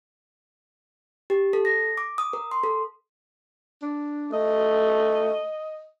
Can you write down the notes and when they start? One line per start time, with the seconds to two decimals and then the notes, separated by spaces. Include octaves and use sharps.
1.30 G4
1.53 A4
1.65 A#6
1.97 D6
2.18 D#6
2.33 A#4
2.51 C6
2.63 A4
3.82 D4
4.32 A3 D#5